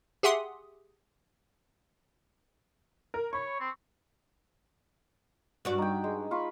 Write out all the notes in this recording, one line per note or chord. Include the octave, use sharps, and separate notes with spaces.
G4 G#4 E5 F#5 C6 D#6
A#4
C#5 B5 C#6
C4
G2 F#4 D5
D#4 G5
G#3
F4 B5 C#6